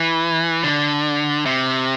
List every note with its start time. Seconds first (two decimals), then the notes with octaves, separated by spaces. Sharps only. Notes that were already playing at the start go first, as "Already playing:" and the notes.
Already playing: E3
0.64 D3
1.46 C3